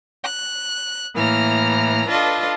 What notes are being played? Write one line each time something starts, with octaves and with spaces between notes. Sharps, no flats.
F#6
A2 E3 A#3 A#5 F6
D4 F4 A4 B4 D#5